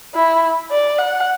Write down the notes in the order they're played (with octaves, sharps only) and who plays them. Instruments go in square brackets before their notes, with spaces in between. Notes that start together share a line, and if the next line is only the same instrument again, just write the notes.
[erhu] E4
D5
F#5